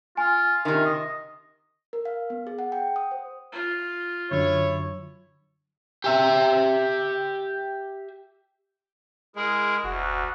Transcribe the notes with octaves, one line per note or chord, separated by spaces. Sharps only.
F4 G#5
C3 D#3 F4
D#5
A#4
F5
B3
G#4
F#5
G5
D#6
C5
F4
F#2 D3 F#3 E4 C#5
G4 E5
G#3 E4 G#4 A#4
F1 D2 F#4